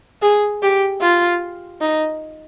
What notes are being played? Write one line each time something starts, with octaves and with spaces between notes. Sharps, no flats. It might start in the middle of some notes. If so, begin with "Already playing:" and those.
G#4
G4
F4
D#4